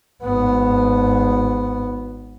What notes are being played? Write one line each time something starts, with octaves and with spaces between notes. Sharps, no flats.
G#1 B3